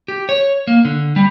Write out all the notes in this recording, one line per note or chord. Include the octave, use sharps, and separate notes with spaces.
G4
C#5
A#3
D3
G3